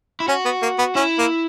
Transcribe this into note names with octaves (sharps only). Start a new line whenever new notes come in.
E4
C#4 F#4
B3
A#3
B3
C#4 E4
A#3